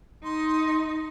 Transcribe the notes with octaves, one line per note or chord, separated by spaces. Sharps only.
D#4 C6